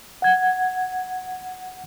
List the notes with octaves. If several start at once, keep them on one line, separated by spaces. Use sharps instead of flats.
F#5 G#6